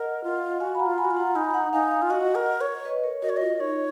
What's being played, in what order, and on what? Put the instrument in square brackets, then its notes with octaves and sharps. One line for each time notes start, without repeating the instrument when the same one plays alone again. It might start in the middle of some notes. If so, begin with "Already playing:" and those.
Already playing: [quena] A#4 [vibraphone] D#5 F#5
[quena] F4
[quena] F#4 [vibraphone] F5 G#5
[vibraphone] B5
F#5 A#5
[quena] F4
[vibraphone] G#5 B5
[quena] F#4
F4
[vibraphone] F#5 A#5
[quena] D#4 [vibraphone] G#5 B5
[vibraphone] F#5 A#5
[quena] D#4 [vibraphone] F5 G#5
[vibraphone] F5 G#5
[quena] F4
[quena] F#4 [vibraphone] D#5 F#5
[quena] A#4
C#5
[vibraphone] B4 D#5
A#4 C#5
[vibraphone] F#4 A#4 [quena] D#5
[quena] C#5
[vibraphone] F4 [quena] D#5
[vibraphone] D#4 [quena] C#5